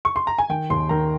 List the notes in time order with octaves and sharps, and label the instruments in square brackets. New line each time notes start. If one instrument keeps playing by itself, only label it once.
[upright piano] C#6
C6
A#5
G#5
D#3 G5
D#2 C6
D#3 A#5